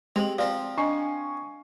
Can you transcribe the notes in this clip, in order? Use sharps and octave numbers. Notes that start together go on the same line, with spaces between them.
G#3 C4 G4 F7 F#7
F3 C4 D5
D4 D#5 G#5 C#6 C7